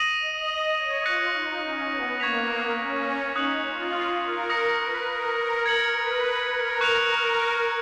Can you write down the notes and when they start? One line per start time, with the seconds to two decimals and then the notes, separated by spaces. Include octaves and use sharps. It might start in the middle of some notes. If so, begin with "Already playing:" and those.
Already playing: D#6 A#6 D#7 F#7
0.19 D#5
0.76 C#5
1.04 F4 D#6 F#6 A#6 C#7
1.34 D#4
1.63 C#4
1.91 B3
2.19 A#3 C#6 G#6 B6 F7
2.78 C#4
3.35 D#4 D#6 F#6 C#7 F#7
3.64 F4
4.22 A#4
4.50 D#6 A#6 C#7
4.79 B4
5.08 A#4
5.36 A#4
5.65 A#4 G#6 C#7 F#7
5.94 B4
6.51 A#4
6.81 C#6 F#6 C#7 F7
7.09 A#4